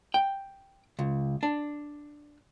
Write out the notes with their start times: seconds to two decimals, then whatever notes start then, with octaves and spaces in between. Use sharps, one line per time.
0.14 G5
0.99 C#2
1.43 D4